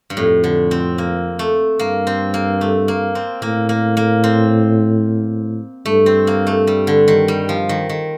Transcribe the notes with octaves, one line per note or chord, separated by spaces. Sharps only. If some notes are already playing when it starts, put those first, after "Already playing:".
G2
F2 A2
D3
C4
A#3
A3
G2 A#3
C4
A#3
A3
A#3
C4
A2 A#3
A#3
A#3
C4
G2 A3
C4
A#3
A3
G3
D3
D#3
G3
F3
D#3
D#3